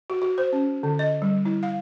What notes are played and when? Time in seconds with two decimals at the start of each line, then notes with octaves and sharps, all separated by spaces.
0.10 F#4
0.22 F#4
0.38 C5
0.53 C#4
0.83 D3
0.99 D#5
1.22 G3
1.45 E4
1.63 F5